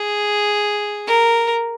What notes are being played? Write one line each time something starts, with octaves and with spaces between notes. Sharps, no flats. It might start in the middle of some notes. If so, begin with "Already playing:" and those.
Already playing: G#4
A#4